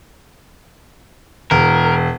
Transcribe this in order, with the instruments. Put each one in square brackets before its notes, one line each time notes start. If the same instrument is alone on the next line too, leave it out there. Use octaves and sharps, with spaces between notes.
[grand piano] E1 [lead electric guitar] A#4